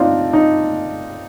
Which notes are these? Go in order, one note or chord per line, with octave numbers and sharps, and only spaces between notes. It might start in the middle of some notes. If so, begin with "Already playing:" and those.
Already playing: C4 D4 D#4 F4
D#4